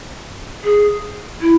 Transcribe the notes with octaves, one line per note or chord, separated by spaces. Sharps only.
G#4
E4